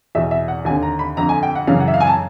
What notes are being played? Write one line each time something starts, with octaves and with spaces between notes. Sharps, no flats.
E2 B2 E5
E5
F#5
D#2 G#5
D3
A#5
B5
F2 D3 A#5
G#5
G5
F#5
F#2 C#3 E3 F5
F#5
E5
F5
G#5
A5